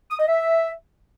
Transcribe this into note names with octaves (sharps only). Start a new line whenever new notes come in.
D#6
D#5
E5